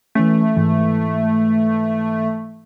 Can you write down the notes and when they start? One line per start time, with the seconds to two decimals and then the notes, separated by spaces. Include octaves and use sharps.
0.15 E3 A3 C#4
0.56 G#2 E3